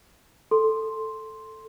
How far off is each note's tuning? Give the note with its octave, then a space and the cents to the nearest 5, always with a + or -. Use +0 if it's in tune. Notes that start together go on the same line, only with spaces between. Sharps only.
A4 +0 C6 +5